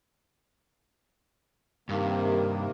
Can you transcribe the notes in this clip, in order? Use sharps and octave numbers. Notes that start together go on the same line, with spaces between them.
G2 C3 D#3 A#3